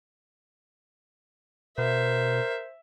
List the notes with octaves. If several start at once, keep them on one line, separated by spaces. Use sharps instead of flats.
B2 A#4 C5 E5